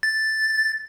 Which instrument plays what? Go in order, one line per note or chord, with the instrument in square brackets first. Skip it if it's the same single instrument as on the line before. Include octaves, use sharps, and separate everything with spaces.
[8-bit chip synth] A6